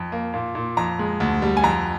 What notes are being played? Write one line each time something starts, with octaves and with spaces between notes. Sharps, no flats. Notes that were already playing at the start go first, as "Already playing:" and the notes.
Already playing: F2
A#3
A#2
A#2
F2 A#5
G#3
D2
G3
G#5
F2 A#5